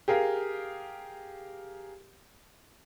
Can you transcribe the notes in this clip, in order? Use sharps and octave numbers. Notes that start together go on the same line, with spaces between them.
G4 G#4 A#4 F5